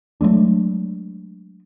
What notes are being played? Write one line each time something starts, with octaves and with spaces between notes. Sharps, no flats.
F#3 G#3 A3 D4